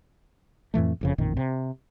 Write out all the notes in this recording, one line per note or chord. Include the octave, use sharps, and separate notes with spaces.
F2 A2 E3 A3
F#1 F2 C#3
A1 F2 A#2 D#3
C3